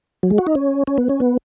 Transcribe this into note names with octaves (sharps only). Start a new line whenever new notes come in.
F#3
G#3
F#4
D#4
C#4
C#4
B3
C#4
B3